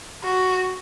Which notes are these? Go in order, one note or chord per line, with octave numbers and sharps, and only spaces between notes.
F#4